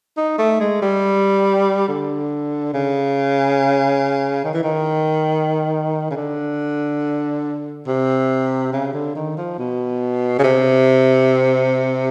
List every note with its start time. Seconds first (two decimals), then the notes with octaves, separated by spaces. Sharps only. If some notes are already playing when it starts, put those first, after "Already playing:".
0.17 D#4
0.38 A3
0.60 G#3
0.82 G3
1.88 D3
2.74 C#3
4.45 D#3
4.54 E3
4.63 D#3
6.11 C#3
6.17 D3
7.87 C3
8.73 C#3
8.94 D3
9.15 D#3
9.37 F3
9.58 B2
10.39 C#3
10.44 C3